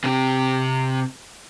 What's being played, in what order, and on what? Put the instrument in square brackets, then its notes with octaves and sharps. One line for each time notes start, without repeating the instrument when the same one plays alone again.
[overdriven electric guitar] C3 G4